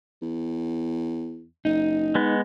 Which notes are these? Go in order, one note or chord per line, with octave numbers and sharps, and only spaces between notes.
E2
F#1 D#4
G#3 B3